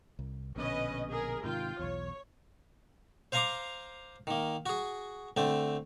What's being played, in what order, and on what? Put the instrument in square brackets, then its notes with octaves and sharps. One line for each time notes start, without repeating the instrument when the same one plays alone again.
[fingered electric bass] C2
[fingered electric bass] A#1 B2 D3 [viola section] C#4 B4 D#5
[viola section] G#4 A#4
[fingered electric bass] G#2 C3 D#3 [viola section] F4 G5
[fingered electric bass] B1 E2 [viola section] C#5
[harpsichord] C5 F5 G#5 A#5 C6 D6
D#3 A#3
F#4 G#4
D3 A3 C4